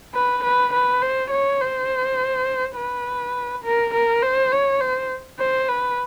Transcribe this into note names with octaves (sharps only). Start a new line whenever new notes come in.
B4
B4
B4
C5
C#5
C5
B4
A#4
A#4
C5
C#5
C5
C5
B4